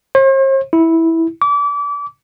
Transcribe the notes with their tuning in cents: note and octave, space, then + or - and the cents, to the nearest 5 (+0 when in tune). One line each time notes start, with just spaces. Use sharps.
C5 +45
E4 -10
D6 -30